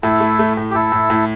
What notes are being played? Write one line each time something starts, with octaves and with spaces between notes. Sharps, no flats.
A2 E4 A4
A3
A3
A2
G4
A2 E4 A4
A2
A2